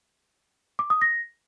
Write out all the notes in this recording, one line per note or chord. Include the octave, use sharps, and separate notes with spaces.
D6
D#6
A#6